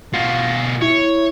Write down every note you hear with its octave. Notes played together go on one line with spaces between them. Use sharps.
B2 F4
E4 C#5